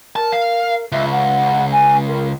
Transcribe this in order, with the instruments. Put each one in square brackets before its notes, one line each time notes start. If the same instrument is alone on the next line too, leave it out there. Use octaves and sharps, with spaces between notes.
[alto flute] A#4 [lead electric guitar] A5
[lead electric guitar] F5
[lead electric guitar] C#2 [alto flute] E5
[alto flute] F#5
G#5
A#4